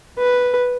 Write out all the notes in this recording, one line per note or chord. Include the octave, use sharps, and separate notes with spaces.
B4